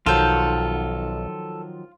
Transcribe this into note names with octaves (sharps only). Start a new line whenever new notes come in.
B1 D#3 F3 F#3 F4 A4 G6